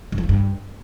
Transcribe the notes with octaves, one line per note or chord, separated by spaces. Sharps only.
G2
F3
A3
G2